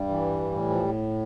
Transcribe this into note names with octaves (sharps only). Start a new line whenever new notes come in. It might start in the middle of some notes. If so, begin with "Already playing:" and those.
Already playing: G2 G3
E3
A2
F3